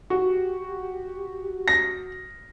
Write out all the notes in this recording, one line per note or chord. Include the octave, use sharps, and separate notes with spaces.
F#4 G4
A#6